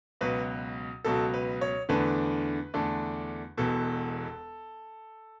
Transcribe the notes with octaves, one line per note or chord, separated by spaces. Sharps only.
C#2 B2 F#3 B4
C#2 B2 F#3 A4
B4
C#5
E2 D3 A3 D4 B4
E2 D3 A3 D4
E1 E2 B2 A4